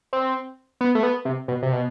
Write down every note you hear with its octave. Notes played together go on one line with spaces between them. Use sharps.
C4
B3
A3
B3
C3
B2
C3
B2